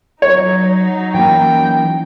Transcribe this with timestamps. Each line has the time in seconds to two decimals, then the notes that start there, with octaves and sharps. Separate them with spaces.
0.22 F#3 D#4 C#5
1.14 E3 A#3 C#4 G5